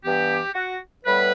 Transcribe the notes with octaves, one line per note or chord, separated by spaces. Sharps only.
G2 E3 B3 G4
F#4
A2 G3 B3 B4